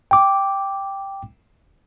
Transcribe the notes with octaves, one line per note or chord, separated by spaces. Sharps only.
G5 D6